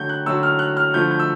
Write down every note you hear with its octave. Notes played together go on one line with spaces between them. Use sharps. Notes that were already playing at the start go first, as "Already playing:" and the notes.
Already playing: D3 F#3 A3 G6
F#6
D3 F#3 A3 E6
F6
F#6
F6
D3 F3 A3 G6
G6
E6